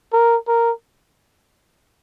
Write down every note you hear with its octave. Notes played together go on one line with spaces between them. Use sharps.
A#4
A#4